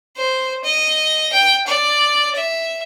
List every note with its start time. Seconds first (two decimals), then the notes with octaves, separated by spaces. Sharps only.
0.17 C5
0.64 D#5
1.33 G5
1.67 D5
2.35 E5